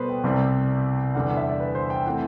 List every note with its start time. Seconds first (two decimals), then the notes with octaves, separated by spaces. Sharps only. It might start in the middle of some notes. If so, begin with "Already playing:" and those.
Already playing: B2 G3 B3 A4 B4 C5
0.09 G5
0.24 C2 C3 G3 C4
1.15 E2 D3 G3 F#5
1.26 F#5
1.37 E5
1.49 D5
1.60 B4
1.75 C5
1.90 G5
2.06 E3 A3 C4 F#5